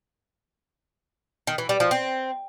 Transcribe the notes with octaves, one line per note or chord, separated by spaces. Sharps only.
D#3
E3
G3
F3
C4